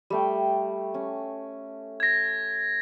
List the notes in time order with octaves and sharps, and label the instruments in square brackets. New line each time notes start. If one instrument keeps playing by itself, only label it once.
[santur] G3 A3 G5
C#4
[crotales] G#6 A#6